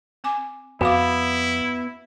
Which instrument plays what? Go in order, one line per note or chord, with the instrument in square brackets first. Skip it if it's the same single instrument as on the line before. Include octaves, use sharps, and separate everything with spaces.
[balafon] C4 G#5 D6
[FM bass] F2 [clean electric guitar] B3 [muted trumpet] E4 [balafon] F#4 F5 D6